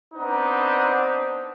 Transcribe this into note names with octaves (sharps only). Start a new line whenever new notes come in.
B3 C4 D4 D#4 B4 C5